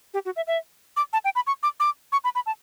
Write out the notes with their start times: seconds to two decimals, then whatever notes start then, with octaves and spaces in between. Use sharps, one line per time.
0.14 G4
0.25 F#4
0.36 E5
0.47 E5
0.97 D6
1.13 A5
1.25 G5
1.35 B5
1.47 C#6
1.63 D6
1.80 D6
2.12 C#6
2.24 B5
2.35 B5
2.46 A5